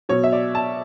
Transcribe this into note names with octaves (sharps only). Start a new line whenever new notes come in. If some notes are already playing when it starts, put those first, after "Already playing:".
B2 F#3 C#5
E5
D5
A5